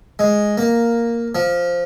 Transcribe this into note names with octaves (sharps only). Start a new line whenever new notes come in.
G#3
A#3
F3